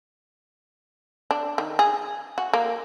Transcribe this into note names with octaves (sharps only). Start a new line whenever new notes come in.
D4
D#3
G#4
F#4
A#3